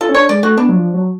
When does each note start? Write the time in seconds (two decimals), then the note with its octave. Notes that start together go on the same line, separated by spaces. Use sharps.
0.01 F4 A4
0.09 C#4
0.14 D4 C#5
0.29 G#3 D5
0.43 A3 F#4
0.57 B3 D4
0.69 F#3
0.76 F3
0.94 F#3